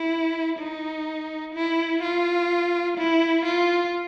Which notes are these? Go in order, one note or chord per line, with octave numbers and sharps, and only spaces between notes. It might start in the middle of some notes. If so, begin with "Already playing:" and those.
Already playing: E4
D#4
E4
F4
E4
F4